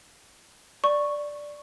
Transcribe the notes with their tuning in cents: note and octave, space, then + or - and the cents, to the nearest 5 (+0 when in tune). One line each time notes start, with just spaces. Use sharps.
D5 +0 C#6 -5